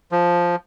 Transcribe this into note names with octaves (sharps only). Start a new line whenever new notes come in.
F3